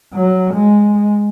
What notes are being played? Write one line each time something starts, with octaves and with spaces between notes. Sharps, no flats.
F#3
G#3